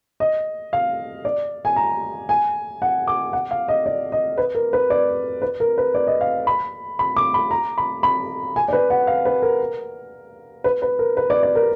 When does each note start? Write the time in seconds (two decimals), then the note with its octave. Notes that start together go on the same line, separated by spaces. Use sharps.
0.20 D#5
0.73 F5
1.25 D5
1.65 G#5
1.76 A#5
2.29 G#5
2.82 F#5
3.07 D6
3.33 F#5
3.51 F5
3.68 D#5
3.86 D5
4.12 D#5
4.38 B4
4.55 A#4
4.73 B4
4.90 D5
5.42 B4
5.60 A#4
5.78 B4
5.95 D5
6.07 D#5
6.21 F5
6.47 B5
6.99 B5
7.16 D6
7.34 B5
7.51 A#5
7.78 B5
8.03 B5
8.56 G#5
8.68 D5
8.73 B4
8.90 F#5
9.07 F5
9.25 B4
9.42 A#4
10.64 B4
10.82 B4
10.99 A#4
11.17 B4
11.30 D5
11.43 D5
11.55 A#4